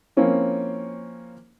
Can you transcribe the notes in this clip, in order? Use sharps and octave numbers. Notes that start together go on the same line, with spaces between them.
F3 A#3 C4 C#4 E4